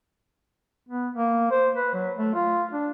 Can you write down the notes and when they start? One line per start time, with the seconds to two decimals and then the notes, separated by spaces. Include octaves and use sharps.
0.89 B3
1.15 A#3
1.51 C5
1.76 B4
1.94 F#3
2.18 A3
2.35 F4
2.72 D4